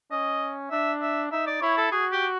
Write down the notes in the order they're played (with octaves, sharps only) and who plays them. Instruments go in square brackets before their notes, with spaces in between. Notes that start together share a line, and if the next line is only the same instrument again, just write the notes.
[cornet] C#4 [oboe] D#5
[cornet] D4 [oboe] E5
[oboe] E5
[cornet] D#4 [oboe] E5
[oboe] D5
[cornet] E4 [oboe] C#5
[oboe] A4
[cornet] F#4 [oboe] G#4
[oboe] G4